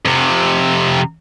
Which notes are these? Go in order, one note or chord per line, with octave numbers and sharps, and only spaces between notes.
F2 C3